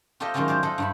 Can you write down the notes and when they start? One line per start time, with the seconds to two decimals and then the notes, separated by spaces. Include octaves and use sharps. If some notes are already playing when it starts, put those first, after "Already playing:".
0.20 F4 G4 A4 C5 D#5 E5
0.34 D#3 F#3 G#3 C#4 F4 F#4
0.48 C5 D5 F5 A5
0.63 A4 D#5 F5 F#5
0.78 G2 E4 B5